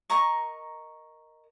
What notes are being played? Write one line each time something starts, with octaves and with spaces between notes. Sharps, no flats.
A#4 D#5 A#5 C#6